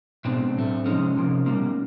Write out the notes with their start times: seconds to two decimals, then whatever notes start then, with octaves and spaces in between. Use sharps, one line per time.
0.25 B2 G#3 C4 D4
0.55 A2 F#3 A3
0.86 C3 F3 G#3 C#4 D#4
1.16 C3 F3 A#3
1.46 B2 G3 A#3